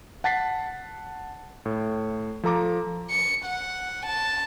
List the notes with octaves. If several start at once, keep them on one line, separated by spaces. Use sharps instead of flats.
F#5 A5 A6 B6 C7
A2
F3 A4 A#5 D6
C#7
F#5
A5